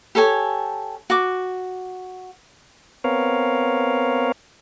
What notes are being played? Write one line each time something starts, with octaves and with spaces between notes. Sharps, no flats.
G4 A4 C#5 G#5
F#4 D6
B3 C4 A#4 C#5 F5